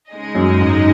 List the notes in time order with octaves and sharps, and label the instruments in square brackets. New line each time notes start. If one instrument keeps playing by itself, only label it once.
[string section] C#3 G#3 D#4 G#4 D#5
[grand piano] F#2
G#2